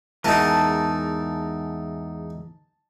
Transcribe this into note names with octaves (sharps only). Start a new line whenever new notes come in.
E2 G#2 E3 D#4 A#4 A5